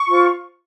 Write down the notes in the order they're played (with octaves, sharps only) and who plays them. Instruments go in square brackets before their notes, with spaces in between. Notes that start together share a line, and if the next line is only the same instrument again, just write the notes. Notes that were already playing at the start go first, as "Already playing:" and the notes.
Already playing: [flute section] C#6
F4 C5